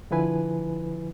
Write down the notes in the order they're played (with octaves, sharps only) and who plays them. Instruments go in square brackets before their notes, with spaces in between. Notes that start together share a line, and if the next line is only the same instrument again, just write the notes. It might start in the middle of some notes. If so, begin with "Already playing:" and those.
[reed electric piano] D3 F3 E4 B4 G#5